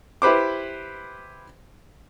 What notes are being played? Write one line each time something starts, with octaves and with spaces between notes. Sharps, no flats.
E4 G4 B4 C5 D6